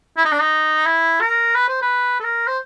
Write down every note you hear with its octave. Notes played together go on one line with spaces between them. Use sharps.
E4
D#4
D4
D#4
E4
A#4
B4
C5
B4
A4
A#4
C5